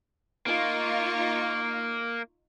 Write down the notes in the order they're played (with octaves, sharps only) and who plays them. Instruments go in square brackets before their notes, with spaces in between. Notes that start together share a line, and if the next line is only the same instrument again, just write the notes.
[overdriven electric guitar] A#3 [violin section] D#4 F4 C#6